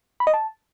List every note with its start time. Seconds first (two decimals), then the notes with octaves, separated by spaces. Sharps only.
0.20 B5
0.27 D#5
0.34 A5